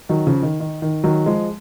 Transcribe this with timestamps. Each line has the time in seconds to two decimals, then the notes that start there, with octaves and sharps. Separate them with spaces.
0.09 D#3 F#3
0.27 C#3 F3
0.42 D#3
0.60 D#3
0.82 D#3
1.04 D#3 F#3
1.26 F3 G#3